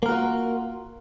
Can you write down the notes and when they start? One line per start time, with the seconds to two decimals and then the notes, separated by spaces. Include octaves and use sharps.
0.03 A#3
0.06 A#4
0.09 F#4
0.12 F4